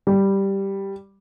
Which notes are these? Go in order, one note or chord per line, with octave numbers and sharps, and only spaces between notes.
G3